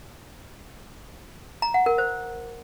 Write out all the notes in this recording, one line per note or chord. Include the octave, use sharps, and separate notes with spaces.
A#5
F#5
A#4
C5